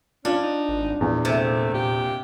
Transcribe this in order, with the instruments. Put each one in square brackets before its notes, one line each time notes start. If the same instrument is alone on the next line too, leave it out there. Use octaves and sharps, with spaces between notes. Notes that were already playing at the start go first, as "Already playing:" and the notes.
[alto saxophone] C#4 [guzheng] D4 [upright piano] F4
[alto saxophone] D#4
[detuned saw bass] G#1
[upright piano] E2 [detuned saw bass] A#2
[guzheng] C3 [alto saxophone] A3
[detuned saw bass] A#2 [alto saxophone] G4